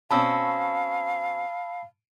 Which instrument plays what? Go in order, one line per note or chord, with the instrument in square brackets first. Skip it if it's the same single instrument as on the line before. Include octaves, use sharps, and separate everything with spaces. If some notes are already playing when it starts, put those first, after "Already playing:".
[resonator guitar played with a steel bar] B2 C4 C#4 [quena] F5 [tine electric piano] A5 B5 E6